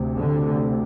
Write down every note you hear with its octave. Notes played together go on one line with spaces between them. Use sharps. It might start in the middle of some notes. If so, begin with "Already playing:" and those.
Already playing: D2 C3
D3